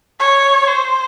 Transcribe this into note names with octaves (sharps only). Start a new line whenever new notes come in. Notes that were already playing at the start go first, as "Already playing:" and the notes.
C#5
C5